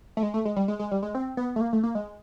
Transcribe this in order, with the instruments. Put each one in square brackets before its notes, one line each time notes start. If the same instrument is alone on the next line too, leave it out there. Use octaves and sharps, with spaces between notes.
[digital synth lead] A3
G#3
A3
G#3
G3
G#3
G#3
G3
G#3
C4
B3
A3
A#3
A3
A#3
G#3